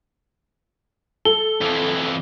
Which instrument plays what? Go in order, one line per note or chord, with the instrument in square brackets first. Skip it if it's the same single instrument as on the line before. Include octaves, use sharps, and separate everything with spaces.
[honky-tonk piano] A4 [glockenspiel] G7
[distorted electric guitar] F2 E3